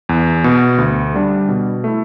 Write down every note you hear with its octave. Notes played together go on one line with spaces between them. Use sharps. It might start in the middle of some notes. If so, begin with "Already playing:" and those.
E2
B2 B3
D2
D3 G3 D4
B2
A3 E4